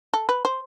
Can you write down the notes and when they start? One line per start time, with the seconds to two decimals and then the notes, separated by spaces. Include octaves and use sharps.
0.14 A4
0.29 B4
0.45 C5